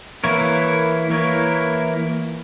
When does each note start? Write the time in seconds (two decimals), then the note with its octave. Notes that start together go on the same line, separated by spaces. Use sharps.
0.24 E3 A#3 E4 A#4 C#5
1.10 E3 A#3 E4 A#4 C#5